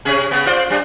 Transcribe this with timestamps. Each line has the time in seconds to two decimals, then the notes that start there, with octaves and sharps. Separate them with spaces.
0.05 C3 C#4 G#4
0.31 C#3 B3
0.46 F4 C5 D5
0.70 G3 D4